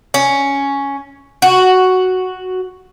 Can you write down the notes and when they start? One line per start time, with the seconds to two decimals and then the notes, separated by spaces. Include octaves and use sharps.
0.14 C#4
1.42 F#4